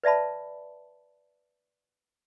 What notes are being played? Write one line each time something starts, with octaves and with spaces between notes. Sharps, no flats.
B4 D5 E5 A5 B5